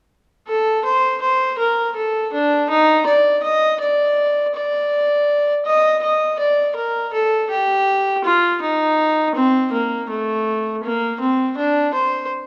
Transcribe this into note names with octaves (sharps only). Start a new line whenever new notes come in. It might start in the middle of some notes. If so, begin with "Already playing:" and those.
A4
C5
C5
A#4
A4
D4
D#4
D5
D#5
D5
D5
D#5
D#5
D5
A#4
A4
G4
F4
D#4
C4
A#3
A3
A#3
C4
D4
C5